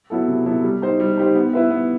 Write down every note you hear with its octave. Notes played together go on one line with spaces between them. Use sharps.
F#3 B3 E4 A4
C3
F#3 B3 E4 A4
G3
D#4 G4 C5
G3
D#4 G4 C5
B3
E4 B4 E5
B3